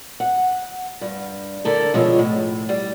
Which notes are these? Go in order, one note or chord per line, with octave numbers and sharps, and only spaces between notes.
F#5
G2
D3 E4 A4 A#4
B2 F3 G#3 F4 C#5 E5
A2
G3